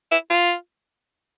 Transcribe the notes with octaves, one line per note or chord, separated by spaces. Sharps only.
E4
F4